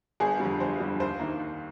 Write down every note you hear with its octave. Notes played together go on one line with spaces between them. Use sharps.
G1 G#4
F2 D3 G3
G1 C5
F2 D3 G3
D#2 C5
D#3 A#3
D#2